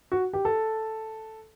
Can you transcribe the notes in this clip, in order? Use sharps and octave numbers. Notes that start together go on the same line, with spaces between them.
F#4
G4
A4